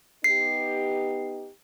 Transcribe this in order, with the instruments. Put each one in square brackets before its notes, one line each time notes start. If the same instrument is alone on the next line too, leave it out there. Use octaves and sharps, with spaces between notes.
[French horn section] B3 D#4 G4 [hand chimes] C7